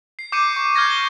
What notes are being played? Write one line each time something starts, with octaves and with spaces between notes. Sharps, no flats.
C7
D6 G6 C7 C#7 D#7
C#6 C7
F6 G6 G#6 A#6 C7
G7